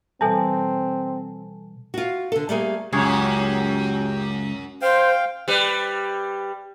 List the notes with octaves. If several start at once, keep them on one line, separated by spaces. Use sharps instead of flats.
B2 E3 G3 C4 A4 G#5 A5
F4 F#4
D3 A4
G3 A3 A#3 G#4
C#2 F#2 G4 G#4 C#5
C5 F5 G5
G3 B4